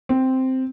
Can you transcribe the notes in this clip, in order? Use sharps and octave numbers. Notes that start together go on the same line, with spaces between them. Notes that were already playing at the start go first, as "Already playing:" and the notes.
C4